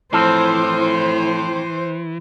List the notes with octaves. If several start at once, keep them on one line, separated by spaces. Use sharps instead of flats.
A2 E3 F3 C4 A4 C5